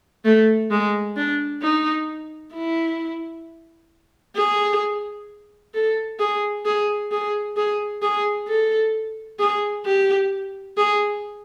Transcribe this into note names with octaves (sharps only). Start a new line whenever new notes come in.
A3
G#3
D4
D#4
E4
G#4
A4
G#4
G#4
G#4
G#4
G#4
A4
G#4
G4
G#4